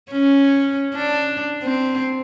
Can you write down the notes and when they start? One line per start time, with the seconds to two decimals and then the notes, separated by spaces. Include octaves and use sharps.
0.12 C#4
0.95 D4
1.63 C4